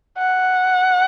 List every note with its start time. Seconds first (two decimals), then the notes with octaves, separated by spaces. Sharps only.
0.18 F#5